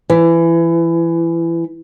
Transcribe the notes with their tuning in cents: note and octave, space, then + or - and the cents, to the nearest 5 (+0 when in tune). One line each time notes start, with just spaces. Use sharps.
E3 +20